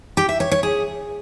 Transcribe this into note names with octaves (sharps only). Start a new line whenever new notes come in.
G4
E5
C#5
C#5
G#4